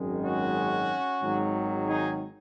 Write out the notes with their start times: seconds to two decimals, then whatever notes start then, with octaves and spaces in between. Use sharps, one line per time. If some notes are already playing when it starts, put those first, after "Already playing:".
Already playing: G#1 F#2 D#3 G#3
0.24 C#4 F#4
1.22 G#1 G#2 D#3 F#3
1.87 D#4 G#4